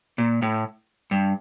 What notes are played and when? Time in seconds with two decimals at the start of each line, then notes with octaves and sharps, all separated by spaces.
0.18 A#2
0.42 A2
1.11 G2